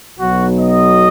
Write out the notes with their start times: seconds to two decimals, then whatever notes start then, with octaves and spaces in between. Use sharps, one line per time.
0.19 B1 B2 F#3 F#4
0.58 D#5